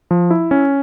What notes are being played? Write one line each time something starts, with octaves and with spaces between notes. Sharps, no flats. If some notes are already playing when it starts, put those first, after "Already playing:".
F3
E4
C#4